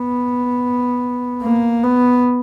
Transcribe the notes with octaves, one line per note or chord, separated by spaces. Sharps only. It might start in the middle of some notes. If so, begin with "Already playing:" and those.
Already playing: B3
A#3
B3